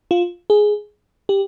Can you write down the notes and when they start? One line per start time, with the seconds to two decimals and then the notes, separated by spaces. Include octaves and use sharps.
0.11 F4
0.50 G#4
1.29 G4